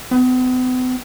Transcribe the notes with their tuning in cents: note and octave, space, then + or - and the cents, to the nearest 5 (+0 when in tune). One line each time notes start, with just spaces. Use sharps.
B3 +45